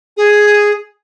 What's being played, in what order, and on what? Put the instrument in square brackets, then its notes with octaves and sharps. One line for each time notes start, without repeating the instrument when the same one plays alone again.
[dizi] G#4